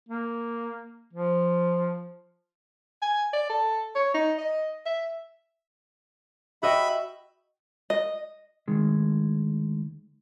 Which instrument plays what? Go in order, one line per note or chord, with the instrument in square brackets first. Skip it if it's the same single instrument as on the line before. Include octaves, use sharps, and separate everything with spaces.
[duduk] A#3
F3
[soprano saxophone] G#5
D5
A4
C#5
D#4
D#5
E5
[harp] F#4 D#5 G5 [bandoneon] E5 B5
[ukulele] D#5
[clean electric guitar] D2 D#3 G#3